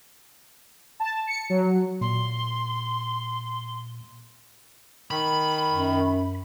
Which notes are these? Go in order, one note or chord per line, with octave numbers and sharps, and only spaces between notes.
A5
C#7
F#3
A#2 C6
D#3 B5
F#2